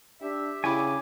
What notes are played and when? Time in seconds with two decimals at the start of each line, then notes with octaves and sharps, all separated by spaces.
0.22 D4 G4 E5
0.64 C#3 E4 G5 G#5 B5 D6